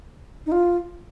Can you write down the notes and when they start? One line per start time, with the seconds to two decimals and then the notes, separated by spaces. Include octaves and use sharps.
0.46 D#4
0.52 F4